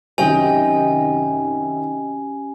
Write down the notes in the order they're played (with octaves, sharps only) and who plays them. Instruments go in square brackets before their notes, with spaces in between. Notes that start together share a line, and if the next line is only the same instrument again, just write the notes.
[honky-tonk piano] F#2 C3 D#3 [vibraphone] C#4 G4 [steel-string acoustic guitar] D#5 G5 [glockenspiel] G#5